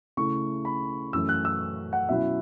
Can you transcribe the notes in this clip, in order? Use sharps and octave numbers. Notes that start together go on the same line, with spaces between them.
C#3 A3 E4 C#6
B5
F#2 E3 A3 C#4 E6
F#6
E6
F#5
B2 F#3 C#4 E4 E5